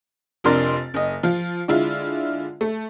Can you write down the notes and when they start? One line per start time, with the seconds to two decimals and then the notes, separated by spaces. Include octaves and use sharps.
0.44 F1 F2 D4 A#4 C6 A6
0.94 F#1 D#5
1.23 F3 F4
1.68 D3 G#3 E4 F4
2.61 A3